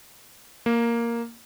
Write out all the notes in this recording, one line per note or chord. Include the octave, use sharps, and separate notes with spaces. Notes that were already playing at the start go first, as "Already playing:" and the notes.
A#3